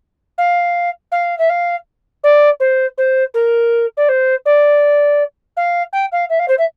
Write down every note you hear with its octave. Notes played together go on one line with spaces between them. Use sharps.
F5
F5
E5
F5
D5
C5
C5
A#4
D5
C5
D5
F5
G5
F5
E5
F5
C5
E5